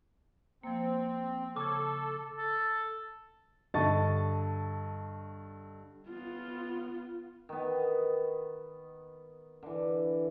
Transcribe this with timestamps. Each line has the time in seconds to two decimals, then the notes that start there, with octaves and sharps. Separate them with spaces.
0.63 F3 A#3 C4
1.56 C#3 A4 C#6 D6 G#6
2.38 A4
3.74 G2 D3 D#5 A5 C#6 A6
6.09 B3 F4
7.49 D#3 B3
9.63 D3 E3